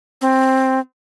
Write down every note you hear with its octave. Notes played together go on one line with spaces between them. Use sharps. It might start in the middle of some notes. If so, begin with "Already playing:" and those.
C4